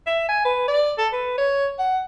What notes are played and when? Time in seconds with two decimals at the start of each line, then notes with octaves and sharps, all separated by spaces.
0.07 E5
0.29 G#5
0.45 B4
0.68 D5
0.98 A4
1.12 B4
1.38 C#5
1.79 F#5